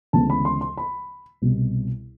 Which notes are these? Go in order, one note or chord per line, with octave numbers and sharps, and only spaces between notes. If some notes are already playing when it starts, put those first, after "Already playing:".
D2 C#3 E3 G#3 B3 A5
B5
C6
C6
B5
C2 B2 G3